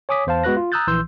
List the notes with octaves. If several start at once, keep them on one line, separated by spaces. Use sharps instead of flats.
C#5 G#5 D6 D#6 B6
E2 C5 F5 A5
G#3 B3 F#4 B4 F#6 A#6
F4
A#5 D#6 E6 F#6 G6 A6
A#1 E3 C6 E6 G6